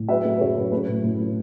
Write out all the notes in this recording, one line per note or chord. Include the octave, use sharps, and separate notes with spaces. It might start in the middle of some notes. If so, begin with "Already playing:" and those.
Already playing: A2
F#3 B4 E5
A3
B4
F#2 A4 C#5
F#2 B4
A3 B4
A2
A2
A3